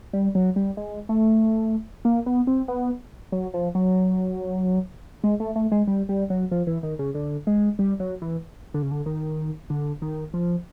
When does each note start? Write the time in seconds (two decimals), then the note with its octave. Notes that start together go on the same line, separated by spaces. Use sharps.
0.13 G3
0.35 F#3
0.56 G3
0.77 G#3
1.09 A3
2.05 A#3
2.26 B3
2.47 C4
2.68 B3
3.32 F#3
3.54 F3
3.75 F#3
5.24 G#3
5.40 A3
5.56 A3
5.72 G#3
5.87 G3
6.09 G3
6.30 F#3
6.51 F3
6.67 E3
6.83 D#3
6.99 C#3
7.15 D3
7.47 G#3
7.79 G3
8.00 F#3
8.22 E3
8.74 D3
8.82 C#3
8.91 D3
9.06 D#3
9.70 D3
10.02 D#3
10.34 F3